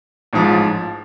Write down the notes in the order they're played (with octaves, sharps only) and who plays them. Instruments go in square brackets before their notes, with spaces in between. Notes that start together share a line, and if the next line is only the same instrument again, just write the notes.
[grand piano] A1 G#2 F3